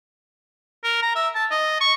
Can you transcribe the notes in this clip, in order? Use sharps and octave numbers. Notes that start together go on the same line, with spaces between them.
A#4
A#5
E5
A5
D#5
C#6